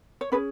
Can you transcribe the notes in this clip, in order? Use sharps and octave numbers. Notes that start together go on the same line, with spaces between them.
C#5
C#4 G#4 B4